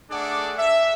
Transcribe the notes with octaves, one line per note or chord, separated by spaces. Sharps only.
A3 D4 G#4 A4 D5 F#5
E5